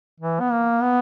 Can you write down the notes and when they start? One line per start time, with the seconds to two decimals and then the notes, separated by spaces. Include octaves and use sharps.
0.20 E3
0.40 B3
0.52 A#3
0.82 B3